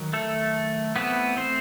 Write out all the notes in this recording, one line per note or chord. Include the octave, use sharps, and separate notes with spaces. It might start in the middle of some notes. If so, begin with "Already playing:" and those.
Already playing: D#3 F#3
A3 A4
E3 A3 B3 C4 B4
C4 C5